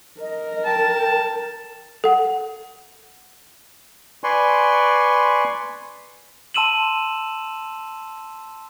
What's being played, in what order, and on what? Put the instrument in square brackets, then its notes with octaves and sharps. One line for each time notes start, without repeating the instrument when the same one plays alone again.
[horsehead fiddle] A#4 [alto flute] D#5
[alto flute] G5 [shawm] A5
[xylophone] A4 F#5
[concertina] B4 D5 G#5 C6 C#6
[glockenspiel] A5 C6 E6 D#7 E7 F#7